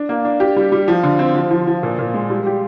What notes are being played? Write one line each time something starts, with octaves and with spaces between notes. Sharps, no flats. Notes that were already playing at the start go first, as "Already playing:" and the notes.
Already playing: D4
A#3
D4
G4
G3
G3
F3
D3
C4
F3
F3
F3
A#2
A#2
G#3
G3
G4